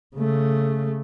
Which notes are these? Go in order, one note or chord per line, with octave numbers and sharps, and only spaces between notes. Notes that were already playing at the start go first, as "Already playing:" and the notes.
C#3 A3